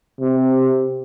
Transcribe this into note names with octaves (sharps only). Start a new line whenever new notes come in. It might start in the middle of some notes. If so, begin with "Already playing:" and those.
C3